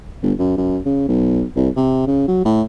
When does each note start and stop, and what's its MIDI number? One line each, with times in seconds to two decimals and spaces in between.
0.23 0.33 31
0.39 0.55 42
0.57 0.78 42
0.85 1.04 49
1.08 1.43 35
1.56 1.69 36
1.77 2.06 48
2.07 2.27 49
2.28 2.45 54
2.45 2.62 45